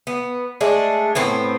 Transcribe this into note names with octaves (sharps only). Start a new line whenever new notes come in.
B3
G#3 A3 D4
A2 B3 C4